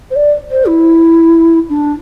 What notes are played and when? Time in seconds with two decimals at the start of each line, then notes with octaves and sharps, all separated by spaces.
0.10 C5
0.16 D5
0.51 C5
0.67 E4
1.69 D4